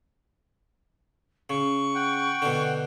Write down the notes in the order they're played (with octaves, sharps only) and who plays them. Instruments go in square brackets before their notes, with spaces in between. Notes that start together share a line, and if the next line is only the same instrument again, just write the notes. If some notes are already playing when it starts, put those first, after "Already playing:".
[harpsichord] C#3 [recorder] C#6
[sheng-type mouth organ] F#5 G5
[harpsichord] B2 D3